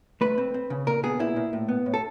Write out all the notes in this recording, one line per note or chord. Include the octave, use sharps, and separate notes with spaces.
A3 B4
C4
C4
C#3
A#2 A#4
B3 G#4
A#2 E4
A#2
A2
B3
A2
A4